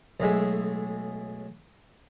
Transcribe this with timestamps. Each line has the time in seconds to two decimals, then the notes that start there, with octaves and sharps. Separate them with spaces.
0.20 B1 A2 G#3 E5